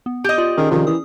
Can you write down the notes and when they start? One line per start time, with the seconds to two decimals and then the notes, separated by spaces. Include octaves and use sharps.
0.06 B3
0.24 G4 D#5
0.38 F4 D5
0.57 D#3 C#4 G#4
0.71 C3 D#3 F3
0.87 E3 D#6